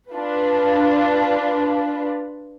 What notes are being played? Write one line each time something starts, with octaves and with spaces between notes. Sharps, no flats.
D4 F4 B4